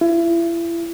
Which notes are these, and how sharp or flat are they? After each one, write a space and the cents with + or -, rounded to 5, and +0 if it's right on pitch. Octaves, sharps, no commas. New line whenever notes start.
E4 +35